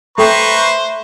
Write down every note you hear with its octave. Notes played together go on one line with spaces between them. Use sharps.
A3 A4 B4 C5 G5 A#5 B5 C#6